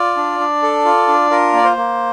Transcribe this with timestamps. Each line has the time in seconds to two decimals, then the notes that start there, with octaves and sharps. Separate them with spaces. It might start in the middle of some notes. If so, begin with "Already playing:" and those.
Already playing: F4 D5
0.17 D4
0.39 D4
0.63 A4
0.85 F4
1.08 D4
1.30 F4 A#4
1.53 A#3 D5
1.64 C5
1.77 A#3